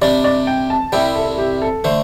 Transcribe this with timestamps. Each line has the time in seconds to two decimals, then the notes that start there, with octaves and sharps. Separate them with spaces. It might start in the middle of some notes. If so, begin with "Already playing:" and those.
0.02 C3 G3 D4 D5
0.24 D5
0.47 G5
0.70 A5
0.92 C2 C3 G3 E4 G5
1.15 A4
1.38 G4
1.62 A4
1.84 D3 A3 C5